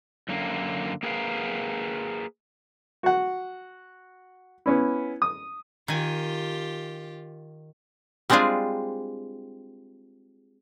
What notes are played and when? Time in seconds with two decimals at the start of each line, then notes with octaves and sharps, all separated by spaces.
0.29 F#2 D3 A#3
1.03 A#3 G#4 A#4 B4 F5
3.03 F#4 F#5
4.66 B3 C#4 E4
5.22 D#6
5.88 D#3 F4 G4 G#5
8.30 G3 G#3 C4 D4 F4 G#4